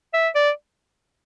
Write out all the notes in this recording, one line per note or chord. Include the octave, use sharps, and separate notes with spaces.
E5
D5